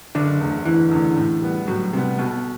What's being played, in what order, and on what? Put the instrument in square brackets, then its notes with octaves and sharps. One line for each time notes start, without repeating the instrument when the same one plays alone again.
[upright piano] F#1 [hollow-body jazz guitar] D3
[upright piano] E2 D3 A3
[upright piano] F#1 [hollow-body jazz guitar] E3
[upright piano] E2 D3 A3
A2
G3 B3
[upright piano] A2 [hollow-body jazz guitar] F#3
[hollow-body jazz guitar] C3 [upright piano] G3 B3
[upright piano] B1 [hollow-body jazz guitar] B2